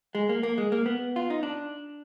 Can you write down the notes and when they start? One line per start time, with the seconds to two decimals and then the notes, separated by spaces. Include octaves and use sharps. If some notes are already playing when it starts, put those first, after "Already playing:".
0.15 G#3
0.29 A#3
0.43 A#3
0.58 G#3
0.72 A#3
0.86 B3
1.16 F4
1.30 D#4
1.43 D4